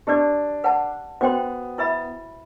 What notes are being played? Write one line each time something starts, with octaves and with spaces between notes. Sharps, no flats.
D4 G4 B4 D5
B4 F#5 A5
B3 F#4 C5 G5 C6
E4 B4 E5 B5